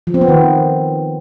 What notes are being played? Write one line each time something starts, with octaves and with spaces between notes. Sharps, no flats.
F3
C4
B3
D#3